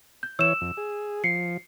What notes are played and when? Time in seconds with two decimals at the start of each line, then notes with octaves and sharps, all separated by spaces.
0.23 G6
0.39 E3 C#5 E6 E7
0.61 F2
0.77 G#4
1.24 F3 C7 C#7